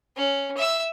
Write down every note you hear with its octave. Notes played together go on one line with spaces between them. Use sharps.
C#4
E5 E6